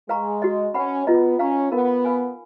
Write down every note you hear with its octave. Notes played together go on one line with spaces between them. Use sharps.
G#3 B4 F5 A#5 C#6
F#4 B4 D#5
C#4 B4 F#5 B5
B3 F4 B4 D#5 A#5
C#4 B4 F5 A#5 C#6
B3 D#4 A#4 F5 B5
B4 F5 G#5 B5